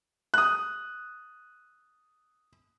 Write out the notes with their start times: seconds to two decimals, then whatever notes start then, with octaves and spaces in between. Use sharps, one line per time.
0.34 D#6 F#6